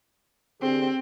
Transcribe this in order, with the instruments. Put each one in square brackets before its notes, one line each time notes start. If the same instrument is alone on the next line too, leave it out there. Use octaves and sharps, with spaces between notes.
[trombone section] D3 G4 G#4 [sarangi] C4